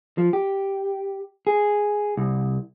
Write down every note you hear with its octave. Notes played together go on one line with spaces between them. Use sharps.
F3
G4
G#4
C2